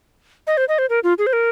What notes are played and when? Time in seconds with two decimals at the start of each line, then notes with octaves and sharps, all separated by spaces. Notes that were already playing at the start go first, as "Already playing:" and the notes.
0.47 D#5
0.57 C5
0.68 D#5
0.78 C5
0.90 A#4
1.04 F4
1.18 G#4
1.27 C5
1.33 A#4